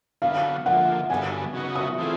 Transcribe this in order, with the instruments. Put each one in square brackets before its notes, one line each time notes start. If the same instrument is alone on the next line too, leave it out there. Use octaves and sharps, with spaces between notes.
[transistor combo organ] D3 F#3 B3 [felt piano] F5
[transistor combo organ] D3 F3 A#3 [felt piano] F#5
[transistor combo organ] G2 D3 F#3 B3 [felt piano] G#5
[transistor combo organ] C#3 F#3 B3 D#4 F#4
[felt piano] D#6
[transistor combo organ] E3 A3 C4 F4 G#4